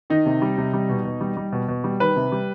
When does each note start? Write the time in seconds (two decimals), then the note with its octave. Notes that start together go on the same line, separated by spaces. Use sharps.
0.10 D#3 D#4
0.26 C3
0.42 G3
0.58 C3
0.73 G3
0.89 B2
1.05 B2
1.21 G3
1.37 G3
1.52 B2
1.68 B2
1.84 G3
2.00 D#3 B4
2.16 C3
2.32 G3